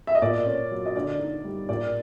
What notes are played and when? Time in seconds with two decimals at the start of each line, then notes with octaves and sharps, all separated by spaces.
0.07 E5
0.15 D#5
0.22 A#2 D5
0.46 C#4
0.71 F#3
0.86 D#5
0.96 D3 D5
1.19 D#4
1.44 G3
1.69 A#2 D5